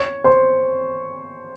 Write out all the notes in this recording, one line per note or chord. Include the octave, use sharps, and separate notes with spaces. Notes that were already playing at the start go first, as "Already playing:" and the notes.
Already playing: C#5 C#6
C5 C6